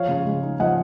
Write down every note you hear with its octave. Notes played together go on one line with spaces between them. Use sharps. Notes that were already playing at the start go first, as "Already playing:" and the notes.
Already playing: F3 C#5 F5
C#3
G#3
D#4
F3 D#5 F#5